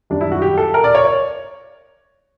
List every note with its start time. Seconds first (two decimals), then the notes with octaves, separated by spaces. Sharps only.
0.10 F#2 D#3 G3 D4
0.21 E4
0.32 F#4
0.42 G4
0.58 A4
0.74 A#4
0.84 D5
0.95 C#5
1.05 C#5